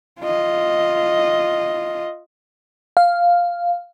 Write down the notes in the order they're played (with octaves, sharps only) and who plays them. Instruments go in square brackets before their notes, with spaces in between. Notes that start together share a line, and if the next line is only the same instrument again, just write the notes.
[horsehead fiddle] F4 D#5
[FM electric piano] F5